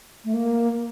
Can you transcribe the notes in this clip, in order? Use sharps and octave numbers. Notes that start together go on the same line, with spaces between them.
A3
A#3